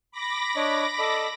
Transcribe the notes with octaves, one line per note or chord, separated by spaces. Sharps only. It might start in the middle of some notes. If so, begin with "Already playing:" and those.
B5 D6 A#6
D4 C#5 D#5
A4 D5 D#5